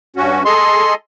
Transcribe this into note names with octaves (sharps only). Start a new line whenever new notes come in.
G2 C#4 F#4
G#4 A4 D#5 C6